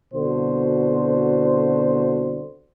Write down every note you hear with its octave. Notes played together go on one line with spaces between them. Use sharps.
C2 B2 D3 F#4 A4 C5